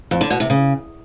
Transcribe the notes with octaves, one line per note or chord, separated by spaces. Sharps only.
F2
D3
B2
C3
C#3